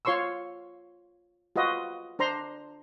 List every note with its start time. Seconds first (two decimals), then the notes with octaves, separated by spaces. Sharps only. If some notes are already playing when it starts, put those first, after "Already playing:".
0.05 F4 C#5 C6 C#6 E6
1.56 F4 F#4 B4 D#5
2.19 D4 C5 A#5 C6